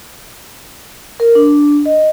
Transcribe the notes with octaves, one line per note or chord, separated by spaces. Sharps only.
A#4
D4
D#5